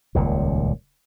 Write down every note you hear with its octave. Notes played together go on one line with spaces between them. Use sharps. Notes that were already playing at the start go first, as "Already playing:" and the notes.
D#1 C#2 A#2